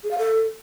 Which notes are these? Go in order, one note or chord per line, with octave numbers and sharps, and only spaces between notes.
G#4
F5
A4